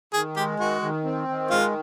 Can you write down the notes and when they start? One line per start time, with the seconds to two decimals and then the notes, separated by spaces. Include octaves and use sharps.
0.13 D#3 G#4
0.36 G#3 G4
0.59 D#3 F#4
0.82 D#3
1.04 C4
1.28 D#3
1.50 G#3 F4